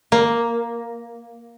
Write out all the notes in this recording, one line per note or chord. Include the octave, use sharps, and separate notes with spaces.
A#3